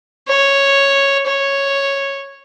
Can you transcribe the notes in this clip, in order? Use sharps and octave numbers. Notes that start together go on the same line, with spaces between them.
C#5
C#5